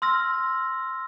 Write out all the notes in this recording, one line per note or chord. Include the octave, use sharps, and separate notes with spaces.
C6 E6 F6 A#6